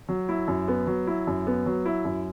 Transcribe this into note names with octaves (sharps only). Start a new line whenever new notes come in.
F#3
E4
F#2
B3
F#3
E4
F#2
B3
F#3
E4
F#2